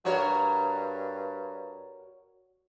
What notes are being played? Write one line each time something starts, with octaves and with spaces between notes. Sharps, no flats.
G2 F#4 A#4 C#5